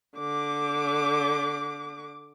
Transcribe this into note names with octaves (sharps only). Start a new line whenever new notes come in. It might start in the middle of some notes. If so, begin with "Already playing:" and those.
D3 D6